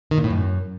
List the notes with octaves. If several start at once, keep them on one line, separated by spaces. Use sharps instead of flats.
D#3
A#2
A2
F#2